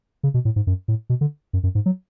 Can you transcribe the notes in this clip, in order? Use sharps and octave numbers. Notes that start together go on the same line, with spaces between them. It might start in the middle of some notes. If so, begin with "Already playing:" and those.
C#3
B2
A2
G#2
F#2
A2
B2
D3
F#2
F#2
G#2
F#3